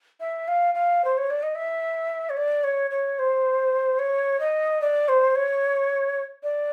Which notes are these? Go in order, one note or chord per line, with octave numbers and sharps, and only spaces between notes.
E5
F5
F5
C5
C#5
D5
D#5
E5
C#5
D5
C#5
C#5
C5
C#5
D#5
D5
C5
C#5
D5